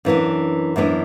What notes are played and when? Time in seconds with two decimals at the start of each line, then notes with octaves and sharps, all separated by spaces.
0.05 F#2 E3 B3 D4
0.76 F#2 E3 B3 D4